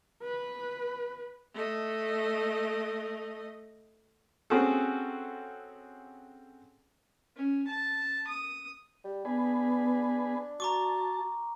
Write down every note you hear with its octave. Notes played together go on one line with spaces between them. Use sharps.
B4
A3 D#5
C4 C#4 F#4 G#4 A4
C#4
A5
D#6
G3
B3 D4 G#4 B4
F#4 A5 A#5 C#6 D6